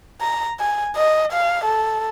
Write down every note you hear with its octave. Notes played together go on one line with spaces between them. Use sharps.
A#5
G#5
D#5
F5
A4